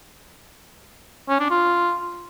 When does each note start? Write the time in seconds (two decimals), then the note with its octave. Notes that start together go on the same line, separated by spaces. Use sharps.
1.29 C#4
1.40 D4
1.51 F4